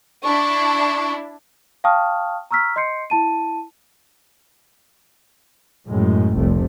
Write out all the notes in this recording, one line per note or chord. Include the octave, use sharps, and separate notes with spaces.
D4 E4 C#6
F5 G5 A5 C#6 D#6 F6
A#5 C#6 E6 F6 B6
D#5 C6 G6 C7 C#7
E4 A5 D#7
F#2 A2 G#3
F1 C2 C3 A3